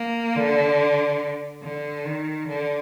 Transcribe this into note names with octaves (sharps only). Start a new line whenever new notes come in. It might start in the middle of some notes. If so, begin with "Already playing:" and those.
Already playing: A#3
D3
D3
D#3
D3